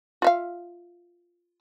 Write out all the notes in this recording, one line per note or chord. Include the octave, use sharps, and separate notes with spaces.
F4 E5 F5